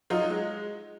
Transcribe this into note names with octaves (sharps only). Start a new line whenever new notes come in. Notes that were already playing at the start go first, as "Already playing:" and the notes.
F#3 D#4 F4
G#3